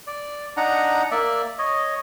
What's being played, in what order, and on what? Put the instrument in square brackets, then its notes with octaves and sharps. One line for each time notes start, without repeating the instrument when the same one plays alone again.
[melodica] D5
D4 D#4 F#5 A#5
A#3 D5 E5
C#5 D#5